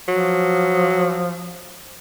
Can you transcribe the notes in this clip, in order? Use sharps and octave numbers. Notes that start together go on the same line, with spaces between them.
F3 F#3